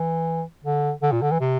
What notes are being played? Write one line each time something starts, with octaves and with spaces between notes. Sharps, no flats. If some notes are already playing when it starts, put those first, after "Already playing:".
Already playing: E3
D3
D3
A#2
D3
E3
C3